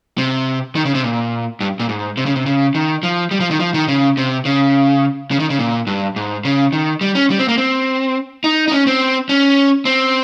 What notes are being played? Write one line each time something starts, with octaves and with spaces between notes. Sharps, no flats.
C3
D#3
C#3
C3
A#2
G2
A#2
G#2
C3
C#3
C3
C#3
D#3
F3
G3
F3
D#3
F3
D#3
C#3
C3
C#3
C#3
D#3
C#3
A#2
G2
G#2
C#3
D#3
G3
C#4
G3
C4
A#3
C4
D#4
D#4
C#4
C4
C#4
C4